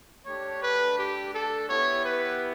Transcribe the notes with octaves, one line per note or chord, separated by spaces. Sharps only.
A3 D4 G4 C#5
B4
G4
A4
B3 E4 G4 C#5
B4